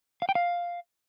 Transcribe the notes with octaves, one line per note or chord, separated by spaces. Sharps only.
F5
G5
F5